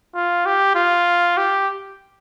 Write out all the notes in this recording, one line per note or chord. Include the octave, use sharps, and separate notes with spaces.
F4
G4
F4
G4